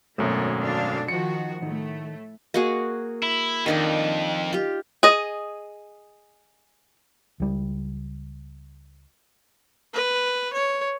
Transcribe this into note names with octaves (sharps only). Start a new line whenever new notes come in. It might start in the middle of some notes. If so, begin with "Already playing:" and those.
G#1 F#2 B2 A3 A#3 C#5
D3 D4 F5
D#3 F3 F#4 F#5 C#7
A2 D#3 A3
A#3 F#4 G#4
E4
F2 D#3 D4 D#4
F4 G4
G#4 D#5
C#2 G3
B4
C#5